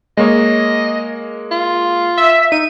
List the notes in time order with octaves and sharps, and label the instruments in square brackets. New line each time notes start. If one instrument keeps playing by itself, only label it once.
[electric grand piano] G#3 A#3 C#5 [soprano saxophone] D#5
[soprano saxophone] F4
[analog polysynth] E5
[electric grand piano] D#4 [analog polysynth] D#7